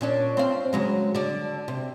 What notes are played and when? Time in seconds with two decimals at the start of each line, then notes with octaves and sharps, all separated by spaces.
0.01 A#2 C#4 D4
0.37 C4 F5
0.73 C#3 F#3 G#3
1.15 D3 D5
1.68 C3